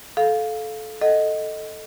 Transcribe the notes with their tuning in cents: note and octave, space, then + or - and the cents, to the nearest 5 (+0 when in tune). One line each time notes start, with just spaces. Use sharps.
A4 -20 F5 +5
A4 +0 D#5 +0 F#5 +0